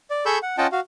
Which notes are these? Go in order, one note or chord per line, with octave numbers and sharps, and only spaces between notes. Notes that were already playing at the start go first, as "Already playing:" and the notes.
D5
G#4 A4 B5 C#6 E6 G6
F#5
C#4 F4 D#5 F#5 G5 A5
F#4 F5